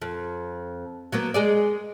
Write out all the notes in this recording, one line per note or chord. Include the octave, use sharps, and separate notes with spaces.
F2
F#3 A#3 B3
G#3 G#4 D5